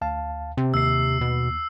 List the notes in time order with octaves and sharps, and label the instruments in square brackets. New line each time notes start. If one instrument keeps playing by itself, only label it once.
[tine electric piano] D2 F5 A5
[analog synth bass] C3 [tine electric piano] C4
[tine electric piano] D#2 [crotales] E6 C7
[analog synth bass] B2